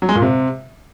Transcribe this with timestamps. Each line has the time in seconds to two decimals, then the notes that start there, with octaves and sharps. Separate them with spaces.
0.02 F#3
0.09 G#3
0.15 A#2
0.22 C3